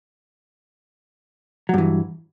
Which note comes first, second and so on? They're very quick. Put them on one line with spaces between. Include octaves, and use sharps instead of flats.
F#3 G2 E3